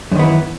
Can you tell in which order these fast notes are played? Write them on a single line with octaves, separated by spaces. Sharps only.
F#2 D#3 B3 E3